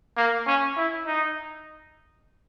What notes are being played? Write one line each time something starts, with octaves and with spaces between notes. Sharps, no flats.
A#3
C#4
E4
D#4